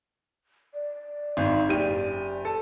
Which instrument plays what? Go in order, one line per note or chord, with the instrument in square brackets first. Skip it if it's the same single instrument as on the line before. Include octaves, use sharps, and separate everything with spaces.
[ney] D5
[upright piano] G#1 G#2
F#1 G4 D#7
A4